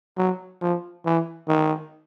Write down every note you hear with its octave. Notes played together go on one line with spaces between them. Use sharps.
F#3
F3
E3
D#3